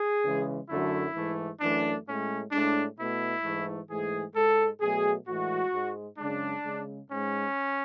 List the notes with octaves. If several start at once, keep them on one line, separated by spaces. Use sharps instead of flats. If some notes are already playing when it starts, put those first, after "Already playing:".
Already playing: G#4
C#3 E3 G#3
F#2 D3 F#3 A3 E4
G#2 E3 A3
F#2 E3 A3 D4
A2 G#3 C#4
A2 G#3 D4
B2 A3 E4
G#2 E3 A3
G#2 E3 A3 G#4
G#2 G#3 A4
B2 F#3 A3 G#4
A2 E3 G#3 F#4
G#2 G#3
F#2 C#3 G#3 D4
C#3 G#3
G#2 G#3 C#4